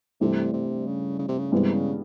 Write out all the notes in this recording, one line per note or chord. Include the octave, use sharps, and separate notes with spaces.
G2 C3 E3 A3
C3
C#3
C#3
C3
C#3
G2 C3 E3 G#3 B3
C#3